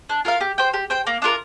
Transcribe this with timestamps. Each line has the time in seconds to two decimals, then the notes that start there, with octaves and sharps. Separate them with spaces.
0.09 D4
0.25 F4 A#4 F5
0.41 G4
0.58 C5 G5
0.74 G4
0.90 C5 G5
1.07 A#3
1.22 D4 F4 A#4